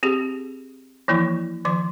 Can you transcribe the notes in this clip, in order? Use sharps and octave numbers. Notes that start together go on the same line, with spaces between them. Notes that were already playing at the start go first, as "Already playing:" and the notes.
C4 G4 G#4
E3 F3 A#3 E4
D#3 F3 D6